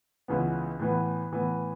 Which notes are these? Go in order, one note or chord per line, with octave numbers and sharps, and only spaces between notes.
C#2 C#3 E3 B3
A2 E3 B3
A2 E3 B3